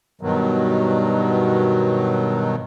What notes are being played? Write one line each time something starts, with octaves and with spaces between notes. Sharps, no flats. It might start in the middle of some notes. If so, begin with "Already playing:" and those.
G2 B2 D#3 F#3